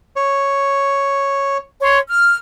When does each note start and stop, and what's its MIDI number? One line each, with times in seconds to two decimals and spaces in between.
0.16 1.58 73
1.81 1.98 73
1.81 1.98 84
2.09 2.37 89